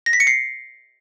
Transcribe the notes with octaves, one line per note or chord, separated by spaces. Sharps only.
A#6
B6
C#7
C7